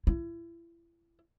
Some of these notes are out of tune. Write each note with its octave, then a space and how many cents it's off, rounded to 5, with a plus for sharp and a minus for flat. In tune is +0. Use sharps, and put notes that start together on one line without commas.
E4 +35